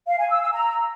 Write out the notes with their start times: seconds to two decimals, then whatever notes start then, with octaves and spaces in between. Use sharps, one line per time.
0.07 F5
0.19 G#5
0.30 E6
0.41 E6
0.53 A#5